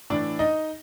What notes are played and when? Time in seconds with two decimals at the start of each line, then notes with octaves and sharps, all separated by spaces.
0.10 A2 E3 D4 D5
0.39 D#4 D#5